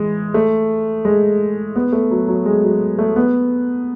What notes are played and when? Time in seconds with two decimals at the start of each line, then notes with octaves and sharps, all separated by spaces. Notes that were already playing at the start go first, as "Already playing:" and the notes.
Already playing: E3 G#3
0.34 A3
1.05 G#3
1.76 B3
1.93 A3
2.11 F#3
2.28 F#3
2.46 G#3
2.64 F#3
2.99 A3
3.16 B3